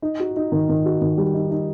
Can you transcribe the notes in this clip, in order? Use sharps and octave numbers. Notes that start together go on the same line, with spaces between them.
D#4
F#4
D#4
D#3
D#3
F#4
D#3
G3
D#4
D#4